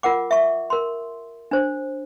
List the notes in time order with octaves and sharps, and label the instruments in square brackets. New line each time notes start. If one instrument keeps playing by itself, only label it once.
[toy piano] F4 A#4 F#5 D6
E5 C#6
A#4 C6
D4 C5